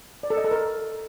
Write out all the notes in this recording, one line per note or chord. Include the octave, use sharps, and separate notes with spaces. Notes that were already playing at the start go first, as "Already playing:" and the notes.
D5
A4
D#5
A4
A#4